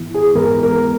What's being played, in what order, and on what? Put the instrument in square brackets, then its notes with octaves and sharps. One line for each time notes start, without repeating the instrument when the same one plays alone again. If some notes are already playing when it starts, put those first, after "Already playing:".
Already playing: [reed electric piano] G#2 E3 B3 E4
[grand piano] G#4
[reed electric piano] G#2 E3 G#3 B3 [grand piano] A#4
[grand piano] A#4